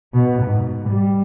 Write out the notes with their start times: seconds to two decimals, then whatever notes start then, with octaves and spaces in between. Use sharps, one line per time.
0.14 B2
0.43 G#2
0.90 G3